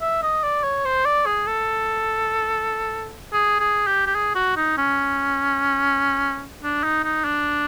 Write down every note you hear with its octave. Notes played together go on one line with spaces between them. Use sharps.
E5
D#5
D5
C#5
C5
D5
G#4
A4
G#4
G#4
G4
G4
G#4
F#4
D#4
C#4
D4
D#4
D#4
D4